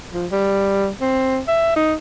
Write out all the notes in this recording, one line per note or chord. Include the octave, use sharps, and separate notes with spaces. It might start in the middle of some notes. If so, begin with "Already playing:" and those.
F3
G3
C4
E5
D#4